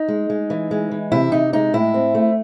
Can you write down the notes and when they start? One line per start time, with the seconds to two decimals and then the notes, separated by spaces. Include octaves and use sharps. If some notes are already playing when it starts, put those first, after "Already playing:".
Already playing: D#4
0.08 G#3
0.30 G#3
0.50 E3
0.71 G#3
0.91 E3
1.12 C3 E4
1.32 C3 D#4
1.53 G#3 D#4
1.74 A2 E4
1.94 C4
2.15 A3